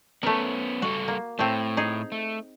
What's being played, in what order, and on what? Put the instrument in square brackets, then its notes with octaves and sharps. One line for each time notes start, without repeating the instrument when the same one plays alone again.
[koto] A3 A#4 [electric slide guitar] B3 C#4
[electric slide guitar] G3 A4 F#5 [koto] F#4
[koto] A#3
[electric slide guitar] A2 [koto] A3 C4
[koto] D#4 G#4
[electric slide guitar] A3